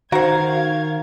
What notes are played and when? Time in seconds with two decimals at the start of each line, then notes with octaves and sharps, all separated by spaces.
0.12 D#3 F#4 A#4 C5 F5 G#6